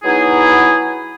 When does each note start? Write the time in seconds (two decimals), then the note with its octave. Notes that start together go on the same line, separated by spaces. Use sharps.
0.03 F#3 B3 D#4 E4 G#4